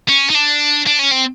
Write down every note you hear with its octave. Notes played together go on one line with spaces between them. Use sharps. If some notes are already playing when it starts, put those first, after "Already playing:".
C#4
D#4
D4
D4
C#4
C4